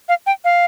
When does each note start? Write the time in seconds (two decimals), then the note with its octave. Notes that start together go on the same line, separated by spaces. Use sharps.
0.09 F5
0.26 G5
0.44 F5